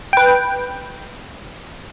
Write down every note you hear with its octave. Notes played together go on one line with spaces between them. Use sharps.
B4 G5